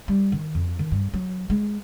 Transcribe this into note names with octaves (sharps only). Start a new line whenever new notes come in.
G3
D#3
F2
D#3
G2
F#3
G#3